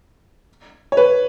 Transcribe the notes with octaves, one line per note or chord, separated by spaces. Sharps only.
C#5
B4